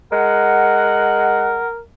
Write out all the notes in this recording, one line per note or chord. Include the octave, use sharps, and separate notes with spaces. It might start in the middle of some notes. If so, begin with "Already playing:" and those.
G#3 A#4 F#5